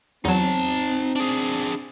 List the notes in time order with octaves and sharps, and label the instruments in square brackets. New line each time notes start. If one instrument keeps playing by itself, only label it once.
[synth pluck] E2 F#3 [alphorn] C4 [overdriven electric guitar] D#4 A5
[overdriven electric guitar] D4 G#4